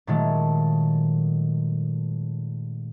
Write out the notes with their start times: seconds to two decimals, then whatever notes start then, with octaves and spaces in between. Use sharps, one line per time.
0.07 A#2 D#3 F#3 G#3 A3